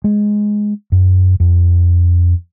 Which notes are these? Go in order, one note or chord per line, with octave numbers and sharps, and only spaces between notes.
G#3
F#2
F2